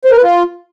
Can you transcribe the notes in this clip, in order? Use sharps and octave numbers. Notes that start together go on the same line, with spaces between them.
C5
A#4
B4
F4